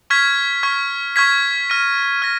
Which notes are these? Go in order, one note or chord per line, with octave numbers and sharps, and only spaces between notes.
C#6 F6 G#6 B6
C#6 F6 G#6 B6
C#6 F6 G#6 B6
F6 A#6 D#7
F6 A#6